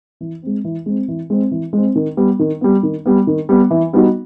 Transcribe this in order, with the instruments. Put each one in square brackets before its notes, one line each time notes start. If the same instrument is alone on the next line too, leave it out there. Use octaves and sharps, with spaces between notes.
[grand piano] E3
G#3 C4
E3
G#3 C4
E3
G#3 C4
E3
G#3 C4
D#3
G3 B3
D#3
G3 B3
D#3
G3 B3
D#3
G3 B3
E3
G3 B3 D#4 F#4